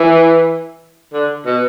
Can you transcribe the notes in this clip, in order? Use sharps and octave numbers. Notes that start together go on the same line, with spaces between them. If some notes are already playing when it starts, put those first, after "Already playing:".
Already playing: E3
D3
B2